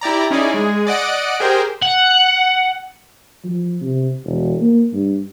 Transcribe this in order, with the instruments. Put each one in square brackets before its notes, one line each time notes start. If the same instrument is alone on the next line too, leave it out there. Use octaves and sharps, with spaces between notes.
[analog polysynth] E4 G4 D5 A#5
C#4 D#4 E4 G#4 D5
G#3 G#4
D5 D#5 F#5 D7
G4 G#4 A#4 C5 G5
[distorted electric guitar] F#5
[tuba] F3
C3
E1
A#3
G2